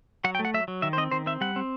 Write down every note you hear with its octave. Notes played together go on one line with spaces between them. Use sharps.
F#3 F#5
G5
A3
F#5
F#3 E5
F#3
D#3 E5
C5
C4 D#5
D#3 C5
C4 E5
G3 F#5
C4